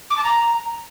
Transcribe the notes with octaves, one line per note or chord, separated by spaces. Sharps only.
D6
A5
A#5